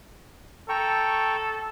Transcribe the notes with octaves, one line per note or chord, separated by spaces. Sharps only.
A4 G5 A#5 C#6